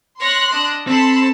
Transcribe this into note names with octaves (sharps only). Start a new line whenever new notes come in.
C#5 C6 F#6 A#6
D4 D#5
C4 A4 A5 B5 C6